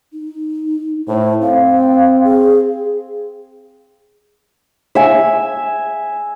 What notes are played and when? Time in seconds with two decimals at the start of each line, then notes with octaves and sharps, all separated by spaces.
0.13 D#4
1.08 A2 C5
1.42 C4 F5
2.24 G#4
4.95 E5 G#5